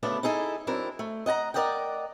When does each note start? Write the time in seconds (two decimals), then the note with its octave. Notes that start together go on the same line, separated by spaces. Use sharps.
0.03 D2 C#3 A3 B3 D4
0.23 D#4 E4 G#4 A4
0.67 F#3 C4 D4 E4 A#4
0.99 A3
1.26 D#5 F#5 A5 A#5
1.54 A#4 D5 D#5 F#5 G5